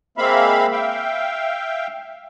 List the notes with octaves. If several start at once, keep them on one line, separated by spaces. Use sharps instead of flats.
G#3 A#3 C4 E5 F5 B5
E5 F5 G5